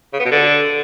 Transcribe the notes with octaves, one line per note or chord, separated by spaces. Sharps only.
C#3
B3
B2
D3